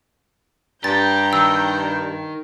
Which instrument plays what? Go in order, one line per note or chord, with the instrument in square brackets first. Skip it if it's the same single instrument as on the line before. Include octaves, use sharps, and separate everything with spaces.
[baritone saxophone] G2 [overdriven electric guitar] G4 [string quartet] G5 A#5 G6 [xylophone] A6
[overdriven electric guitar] D#3 [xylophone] E6